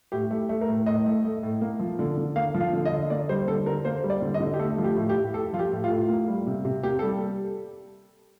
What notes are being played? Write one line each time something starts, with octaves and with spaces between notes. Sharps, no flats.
A2 G4
A3
A3
A#4
A2
A2 D#5
A3
A3
A2
A#3
F3
D3
D3
A#3 F5
F3
F5
D3
D#5
D3
A#3 D5
G3 C5
D3 A4
D3 A#4
A#3 C5
G3
D5
D3
D#5
D3
G4
A3 A4
F3
G4
A2
G4
A2
A3 A4
F3 F4
G4
A2
F4
A2
A#3
G3
C3
C3
A#3 G4
G3 A4